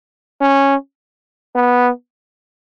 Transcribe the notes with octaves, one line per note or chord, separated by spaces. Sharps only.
C#4
B3